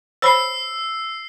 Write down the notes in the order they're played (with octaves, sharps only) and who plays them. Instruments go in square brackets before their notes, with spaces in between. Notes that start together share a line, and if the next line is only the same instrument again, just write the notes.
[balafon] C5 C#5 B5 [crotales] E6 C7